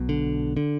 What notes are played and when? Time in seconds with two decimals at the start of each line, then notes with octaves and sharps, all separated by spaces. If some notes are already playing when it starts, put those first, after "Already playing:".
Already playing: B1 B2
0.09 D3
0.57 D3